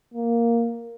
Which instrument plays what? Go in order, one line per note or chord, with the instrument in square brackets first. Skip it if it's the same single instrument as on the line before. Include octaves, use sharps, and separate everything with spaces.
[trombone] A#3